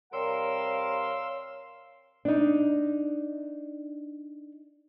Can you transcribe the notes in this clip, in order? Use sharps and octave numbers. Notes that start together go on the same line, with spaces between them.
C3 G3 A#4 C#5 F5 C6 E6
D4 D#4